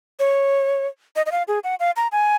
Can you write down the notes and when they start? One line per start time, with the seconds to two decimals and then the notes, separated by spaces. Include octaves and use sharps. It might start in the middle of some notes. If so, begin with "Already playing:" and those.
0.19 C#5
1.16 D#5
1.26 D#5
1.32 F5
1.48 G#4
1.64 F#5
1.80 F5
1.96 A#5
2.12 G#5